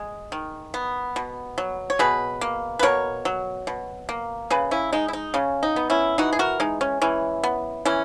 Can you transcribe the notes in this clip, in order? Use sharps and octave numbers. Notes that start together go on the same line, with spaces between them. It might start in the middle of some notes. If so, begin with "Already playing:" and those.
Already playing: G#3
D#3
B3
B2
F#3
C#5
B2 G#4 B4
A#3
B4
B2 A#4 C#5
F#3
B2
A#3
C#3 G#4 B4
C#4 E4
G#3 D#4
E4
D#4
C#3 C#4
D#4
B3
C#4 E4
E3 D#4 F#4
G#4
F#4 A#4
G#3 D#4
C#4
E3 C#4
B3
E3 C#4